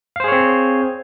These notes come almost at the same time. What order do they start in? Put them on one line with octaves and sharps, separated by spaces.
F5 C5 G#4 C#5 C4